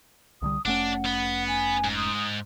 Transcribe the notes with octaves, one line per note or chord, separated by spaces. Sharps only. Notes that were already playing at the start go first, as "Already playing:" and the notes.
C2 D3 G3 D#6
F1 A3 C#4 D4 F#5
B3
G#5
G#2
D#6